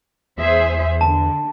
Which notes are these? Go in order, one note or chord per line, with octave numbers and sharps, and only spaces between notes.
E2 G#4 C5 E5
D3 A5